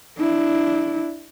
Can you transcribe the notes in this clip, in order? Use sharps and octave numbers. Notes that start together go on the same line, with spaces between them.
D4 E4